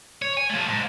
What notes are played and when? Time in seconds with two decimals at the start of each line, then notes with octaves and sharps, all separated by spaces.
0.22 C#5
0.37 G#5
0.50 F3 A3
0.68 G#2